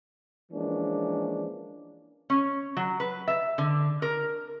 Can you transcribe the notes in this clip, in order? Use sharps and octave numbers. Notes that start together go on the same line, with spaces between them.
E3 F3 G#3 A#3 C#4 D4
C#4
F#3
B4
E5
D3
A#4